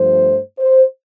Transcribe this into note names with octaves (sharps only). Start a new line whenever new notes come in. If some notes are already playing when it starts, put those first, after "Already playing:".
Already playing: G2 F3 A3 C5
C5